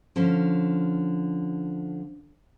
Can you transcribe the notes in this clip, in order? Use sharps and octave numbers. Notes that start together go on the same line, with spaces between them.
D3 F3 C#4